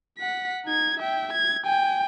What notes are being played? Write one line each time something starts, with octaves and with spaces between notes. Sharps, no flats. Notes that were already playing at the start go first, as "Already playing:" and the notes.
F#5 B6
D#4 G#6
E5 G5
G#6
G5 G#5